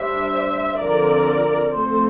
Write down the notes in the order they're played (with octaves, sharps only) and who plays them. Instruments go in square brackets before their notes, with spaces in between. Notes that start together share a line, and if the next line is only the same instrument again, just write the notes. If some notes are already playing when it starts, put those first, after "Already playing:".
Already playing: [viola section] G3 D4 C5 E5
D3 F3 C4 A#4 D5
F3 A3 C4 A4 C5